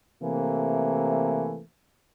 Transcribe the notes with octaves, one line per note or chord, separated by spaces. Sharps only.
C3 E3 A3 A#3